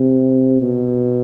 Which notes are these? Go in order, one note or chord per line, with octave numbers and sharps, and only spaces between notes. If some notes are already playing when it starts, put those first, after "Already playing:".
Already playing: C3
B2